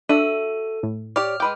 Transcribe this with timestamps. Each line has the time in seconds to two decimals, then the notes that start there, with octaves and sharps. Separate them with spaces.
0.09 D4 F#4 A4 E5
0.83 A2
1.16 G4 C#5 D5 F6
1.40 G#3 B4 G5 D6